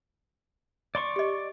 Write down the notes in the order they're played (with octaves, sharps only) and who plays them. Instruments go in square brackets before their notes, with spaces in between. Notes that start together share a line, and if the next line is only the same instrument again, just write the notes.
[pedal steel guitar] D5 C6 C#6
[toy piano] G4 D#5